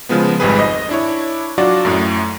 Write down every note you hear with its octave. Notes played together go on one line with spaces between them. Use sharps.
C#3 F3 G#3 B3
G#1 F2 G#2 G3 G#4 B4
D#5
D4 E4 C#5
F#3 D4 F4 F#4 D5
F#2 A2